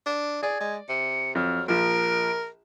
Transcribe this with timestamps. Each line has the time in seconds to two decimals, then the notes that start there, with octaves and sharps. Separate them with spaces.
0.06 D4
0.43 G#4 D5 G#6
0.60 G#3
0.89 C3 C#7
1.35 F2 F#3 F6
1.68 A#1 F3 A#4 D7